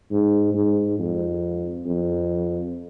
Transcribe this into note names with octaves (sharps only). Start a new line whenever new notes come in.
G#2
G#2
F2
F2